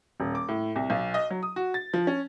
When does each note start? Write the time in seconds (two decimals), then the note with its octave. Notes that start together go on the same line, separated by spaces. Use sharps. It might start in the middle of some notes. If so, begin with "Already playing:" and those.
0.20 D#1
0.35 D6
0.48 A2
0.76 C2
0.90 B1
1.14 D#5
1.31 F#3
1.43 D#6
1.56 F#4
1.74 A6
1.94 F3
2.07 C#4